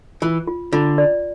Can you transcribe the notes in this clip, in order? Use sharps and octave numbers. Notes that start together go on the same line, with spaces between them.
E3 F4
F4
D3 F4
D5